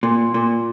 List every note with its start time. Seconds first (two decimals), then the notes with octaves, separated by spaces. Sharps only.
0.03 A#2
0.34 A#2